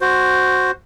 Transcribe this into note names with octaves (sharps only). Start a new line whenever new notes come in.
F#4 C5